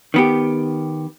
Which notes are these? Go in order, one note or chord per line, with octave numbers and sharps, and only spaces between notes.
D#3 B3 G4